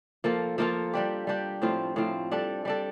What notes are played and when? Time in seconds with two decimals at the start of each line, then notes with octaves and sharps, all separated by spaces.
0.24 F3 A#3 F4 A4
0.58 F3 A#3 F4 A4
0.93 G3 D4 G4
1.27 G3 D4 G4
1.62 A2 F3 C4 F4
1.96 A2 F3 C4 F4
2.31 G3 D4 A4
2.65 G3 D4 A4